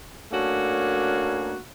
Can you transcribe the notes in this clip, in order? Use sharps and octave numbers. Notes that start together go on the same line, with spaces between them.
A3 A#3 C#4 D4 F#4